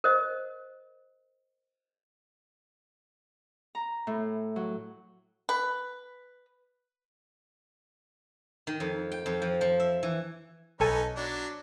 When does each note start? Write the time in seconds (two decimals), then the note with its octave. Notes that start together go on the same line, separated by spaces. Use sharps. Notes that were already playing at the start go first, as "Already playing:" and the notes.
0.04 A#4 C5 D#5
3.75 A#5
4.07 A2
4.56 F#3
5.49 B4
8.67 D#3
8.80 F2
9.12 G5
9.26 F2
9.42 F3
9.61 F3
9.80 E5
10.03 E3
10.80 B1 C#4 D#4 A4 B4 G#5
11.16 F#3 D4 D5